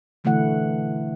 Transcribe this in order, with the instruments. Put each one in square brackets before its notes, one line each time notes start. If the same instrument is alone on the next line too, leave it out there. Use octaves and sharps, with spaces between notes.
[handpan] B2 D3 E3 A3 E4 F#5